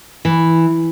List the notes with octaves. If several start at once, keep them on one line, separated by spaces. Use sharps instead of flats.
E3